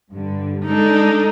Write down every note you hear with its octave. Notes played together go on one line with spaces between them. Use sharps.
G2 D3
G#3 D4 D#4 A4